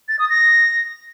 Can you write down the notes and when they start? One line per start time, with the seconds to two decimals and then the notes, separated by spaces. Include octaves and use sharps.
0.08 A6
0.19 D#6
0.29 A#6